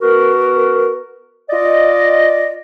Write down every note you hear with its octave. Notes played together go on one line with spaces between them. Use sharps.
B3 F#4 A#4
F4 D5 D#5